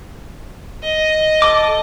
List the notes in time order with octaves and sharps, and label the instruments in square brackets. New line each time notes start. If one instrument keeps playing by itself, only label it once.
[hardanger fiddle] D#5
[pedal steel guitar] A4 D6